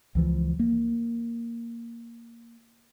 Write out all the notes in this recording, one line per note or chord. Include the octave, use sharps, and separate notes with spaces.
C#2 E3 F3
A#3